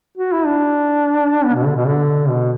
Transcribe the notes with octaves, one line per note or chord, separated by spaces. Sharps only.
F#4
E4
D4
B3
B2
D3
B2
D3
B2